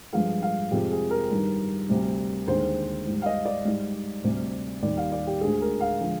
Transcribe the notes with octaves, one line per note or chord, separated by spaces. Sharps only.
G2 F3 G#3 F5
F5
F2 C3 F3 G#3 G4
G#4
A#4
G2 D#3 G3
D2 C3 G3
D#2 D3 G#3 C5
G#2 G3
F5
D#5
D5
G#2 G3
D2 C3 G3
D#2 D#3 G3 D5
F5
D5
G4
D2 D3 G#3 G#4
A#4
F5
D3 F3 G#3